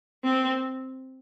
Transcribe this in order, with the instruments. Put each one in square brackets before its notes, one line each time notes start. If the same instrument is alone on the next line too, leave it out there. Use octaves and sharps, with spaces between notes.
[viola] C4